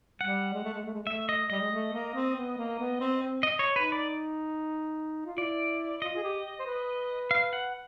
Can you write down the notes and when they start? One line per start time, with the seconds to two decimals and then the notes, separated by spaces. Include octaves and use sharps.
0.21 G3 F#5
0.53 G#3
0.64 A3
0.74 G#3
0.85 A3
0.94 G#3
1.03 A3 E5
1.29 D#5
1.50 G3 D#5
1.61 G#3
1.71 A3
1.93 A#3
2.14 C4
2.36 B3
2.57 A#3
2.79 B3
3.00 C4
3.22 C4
3.43 D#5
3.59 C#5
3.76 D#4 B4
3.92 D5
5.26 F4
5.38 E4 D5
6.02 F4 D#5
6.16 G#4
6.23 G4
6.59 C5
6.67 B4
7.31 F5
7.53 F#5